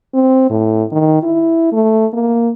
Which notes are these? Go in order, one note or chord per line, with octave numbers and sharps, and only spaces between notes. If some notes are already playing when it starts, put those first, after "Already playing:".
C4
A2
D#3
E4
A3
A#3